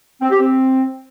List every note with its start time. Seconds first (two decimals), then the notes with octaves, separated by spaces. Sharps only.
0.21 C4
0.30 G4
0.39 C4